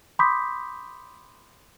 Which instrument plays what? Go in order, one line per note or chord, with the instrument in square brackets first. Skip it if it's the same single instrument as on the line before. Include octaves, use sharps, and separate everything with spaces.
[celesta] B5 C6 D6 D#6 G6 B6